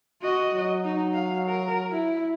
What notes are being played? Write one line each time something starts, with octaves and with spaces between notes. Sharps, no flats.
F#4 D#5
F#3
D#4
F5
A#4
E4